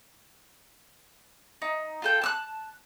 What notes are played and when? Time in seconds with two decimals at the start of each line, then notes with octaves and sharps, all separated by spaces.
1.62 D#4
2.02 F4 A4 G5
2.21 A5 E6 F#6